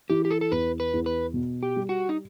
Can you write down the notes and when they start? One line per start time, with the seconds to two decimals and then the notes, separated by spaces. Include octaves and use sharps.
0.10 E3 G4
0.25 G4
0.31 A4
0.41 A4
0.51 E2 B4
0.80 B4
0.94 E2
1.06 B4
1.34 B2
1.63 G4
1.76 G3
1.89 F#4
2.09 D#4